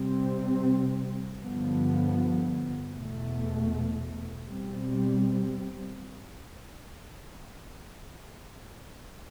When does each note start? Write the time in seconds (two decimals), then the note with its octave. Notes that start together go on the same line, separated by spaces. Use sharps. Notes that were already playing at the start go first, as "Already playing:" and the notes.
Already playing: C3 G3 C4
1.40 G2 D3 F3 B3
2.94 E2 B2 A3
4.48 B2 G3 C4